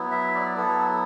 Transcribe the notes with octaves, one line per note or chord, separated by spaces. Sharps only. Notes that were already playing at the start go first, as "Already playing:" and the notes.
Already playing: F#3 B3 E4
E5
D5
F#3 B3 E4 A4